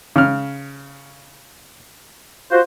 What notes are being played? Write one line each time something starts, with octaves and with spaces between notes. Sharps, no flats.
C#3 F6
F4 F#4 C5